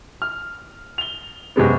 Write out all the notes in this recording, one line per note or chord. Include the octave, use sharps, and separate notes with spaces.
F6
F7 G7
F#2 C3 G#3 B3